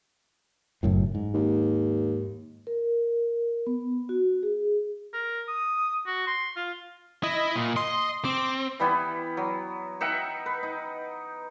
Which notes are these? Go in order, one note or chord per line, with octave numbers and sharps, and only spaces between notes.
F#1 F#2 A2
G#2
D#2
A#4
B3
F#4
G#4
A#4
D#6
F#4
C6
F4
E4 D#5
A#2
D#5 C6
C4 D6
E3 G3 B3 E4
F#3
D#4 E5 F#5 G5
B4
D#4